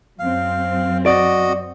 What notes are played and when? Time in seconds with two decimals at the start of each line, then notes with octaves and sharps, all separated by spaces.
0.19 F#2 F#3 C4 F5
1.06 F#4 D5 D#5